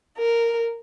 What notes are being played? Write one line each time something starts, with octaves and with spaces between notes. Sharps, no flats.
A#4